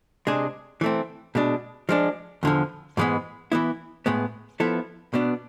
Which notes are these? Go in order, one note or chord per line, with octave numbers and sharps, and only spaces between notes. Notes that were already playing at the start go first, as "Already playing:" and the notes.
C3 G#3 D4 G#4
E3 A3 C4
B2 G#3 D4
F3 G#3 D4
E2 D3 F3
G#2 E3 G#3 B3
E3 B3 E4
A2 G#3 B3
F3 B3 E4 A4
B2 B3 D4